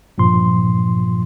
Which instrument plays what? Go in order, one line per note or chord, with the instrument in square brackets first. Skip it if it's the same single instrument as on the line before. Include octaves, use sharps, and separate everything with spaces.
[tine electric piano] G2 A#2 F3 C6